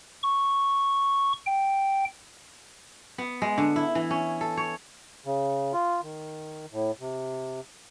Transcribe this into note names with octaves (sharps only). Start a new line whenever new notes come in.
C#6
G5
B3
G#3
D3
E4
E3
C#4
A4
C#5
C#3
F4
D#3
A2
C3